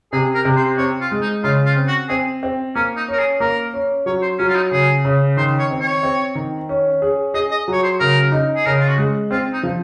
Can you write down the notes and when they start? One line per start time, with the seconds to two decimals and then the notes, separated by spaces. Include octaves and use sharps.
0.12 C3 G#4
0.34 A#4
0.45 C3
0.56 C5
0.77 C4 C#5
1.01 F4
1.11 G#3
1.21 D#4
1.43 C#3 F4
1.65 F4
1.76 C4
1.87 F#4
2.09 C4 G#4
2.43 C4
2.75 A#3 C#4
2.96 D#4
3.08 C#4 A#4
3.19 G#4
3.40 A#3 A#4
3.74 C#4
4.06 F#3 C#5
4.22 C5
4.39 F#3 C#4
4.48 F4
4.56 D#4
4.71 C#3 G#4
5.05 C#3
5.37 D#3 C5
5.59 C#5
5.71 C4
5.81 C#5
6.03 C4
6.35 D#3
6.69 C#4
7.02 G#4
7.34 G#4 D#5
7.51 D#5
7.68 F#3 C#5
7.83 C5
8.00 C#3 A#4
8.32 D#4
8.56 G#4
8.66 C#3 A#4
8.79 F4
8.88 F#4
8.98 G#3
9.31 C4 F4
9.53 D#4
9.63 F3